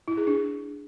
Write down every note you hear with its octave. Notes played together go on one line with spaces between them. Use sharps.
E4
G#4
D4